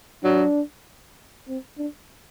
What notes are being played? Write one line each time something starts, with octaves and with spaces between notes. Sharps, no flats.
F#3 D4
C4
D4